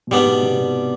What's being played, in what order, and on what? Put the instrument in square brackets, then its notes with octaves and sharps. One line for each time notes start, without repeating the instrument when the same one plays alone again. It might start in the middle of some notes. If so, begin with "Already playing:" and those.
[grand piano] B2
[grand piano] G#2 [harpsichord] G3 B3 D4
[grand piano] B2
C3
B2